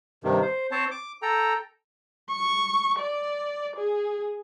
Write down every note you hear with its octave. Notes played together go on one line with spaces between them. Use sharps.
G2 C3 D#3
C5
C4 C5 C#5 A5
D6
A4 G5 A#5
C#6
D5
G#4